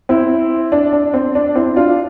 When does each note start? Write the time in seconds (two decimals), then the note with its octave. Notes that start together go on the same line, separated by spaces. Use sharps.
0.09 C4 E4
0.72 D4
0.93 D4
1.14 C4
1.35 D4
1.55 C4 E4
1.76 D4 F4